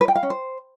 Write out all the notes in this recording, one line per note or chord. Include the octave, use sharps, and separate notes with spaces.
B4
G5
F5
C#4
C5